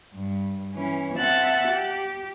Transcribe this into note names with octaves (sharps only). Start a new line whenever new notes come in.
G2
E3 C#4
C4 E5 F#5 A5 F#6 A6
G4